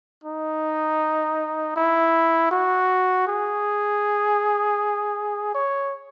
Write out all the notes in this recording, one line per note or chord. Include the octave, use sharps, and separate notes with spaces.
D#4
E4
F#4
G#4
C#5